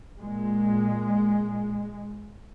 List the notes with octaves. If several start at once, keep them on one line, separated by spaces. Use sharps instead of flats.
A#2 G#3